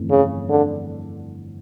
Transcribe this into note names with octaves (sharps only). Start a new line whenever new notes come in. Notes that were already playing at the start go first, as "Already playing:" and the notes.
Already playing: G1 F2 E3 A3
C#3
D3